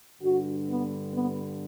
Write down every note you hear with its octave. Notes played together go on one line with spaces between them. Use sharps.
G2 D3 F#4
B3
B3